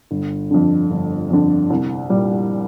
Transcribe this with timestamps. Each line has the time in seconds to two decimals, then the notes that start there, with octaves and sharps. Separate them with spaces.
0.11 G1
0.51 F2 D3
0.91 G1
1.30 F2 D3
1.70 C2
2.10 A#2 G3